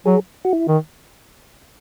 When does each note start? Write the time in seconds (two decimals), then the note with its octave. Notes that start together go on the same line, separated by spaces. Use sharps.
0.06 F#3 G#4
0.45 F#4
0.53 E4
0.68 D#3